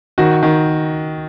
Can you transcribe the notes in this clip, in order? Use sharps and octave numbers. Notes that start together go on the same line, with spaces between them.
D#3 F#4
D#3